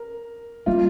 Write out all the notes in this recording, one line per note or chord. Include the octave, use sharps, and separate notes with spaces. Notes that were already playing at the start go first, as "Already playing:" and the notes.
Already playing: A#4
G3 A#3 C#4 F4